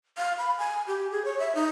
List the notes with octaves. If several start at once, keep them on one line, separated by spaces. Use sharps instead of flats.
F5
B5
G#5
G4
G#4
C#5
E5
D#4